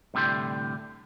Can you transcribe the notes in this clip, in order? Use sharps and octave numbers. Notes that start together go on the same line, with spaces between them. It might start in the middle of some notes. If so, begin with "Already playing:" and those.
C2 A2 D3 G4 C6